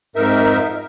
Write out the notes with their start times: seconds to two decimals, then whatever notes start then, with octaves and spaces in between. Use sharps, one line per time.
0.16 F2 G#2 D#4 A#4 E5